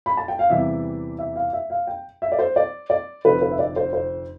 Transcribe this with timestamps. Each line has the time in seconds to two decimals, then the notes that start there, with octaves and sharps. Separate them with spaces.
0.06 B5
0.17 A5
0.28 G5
0.39 F5
0.50 E2 C3 E3 G3 E5
1.19 E5
1.36 F5
1.53 E5
1.70 F5
1.87 G5
2.22 E5
2.32 D5
2.39 C5
2.56 D5
2.90 D5
3.25 F1 F2 D3 F3 B4
3.42 B4
3.52 E5
3.59 D5
3.76 C5
3.93 C5